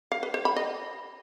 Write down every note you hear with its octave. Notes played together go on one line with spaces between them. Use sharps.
F5
B4
C5
B5
D#5